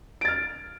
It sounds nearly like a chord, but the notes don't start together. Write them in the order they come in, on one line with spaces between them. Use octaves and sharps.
D7 A6 F6